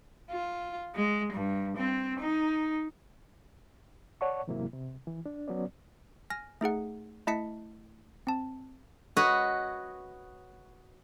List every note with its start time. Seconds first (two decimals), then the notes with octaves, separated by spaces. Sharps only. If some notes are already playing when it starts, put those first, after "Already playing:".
0.31 F4
0.96 G#3
1.33 G2
1.77 C4
2.19 D#4
4.21 C#5 D5 F#5 A5 C#6
4.47 E2 G#2 C3 F#3 A#3 E4
4.73 C3
5.07 E3
5.26 D4
5.48 F#3 B3 C#4 D5
6.30 G#5 F6 A#6
6.61 A3 D#4 G#4 F#5
7.27 A3 E4 D#5 A5 B6 C#7
8.27 C4 A5
9.17 F#4 B4 C#5 D#5